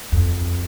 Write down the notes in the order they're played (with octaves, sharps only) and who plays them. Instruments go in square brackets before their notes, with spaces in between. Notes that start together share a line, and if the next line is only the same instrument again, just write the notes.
[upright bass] F2